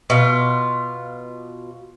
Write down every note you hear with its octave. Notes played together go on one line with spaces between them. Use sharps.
B2 F4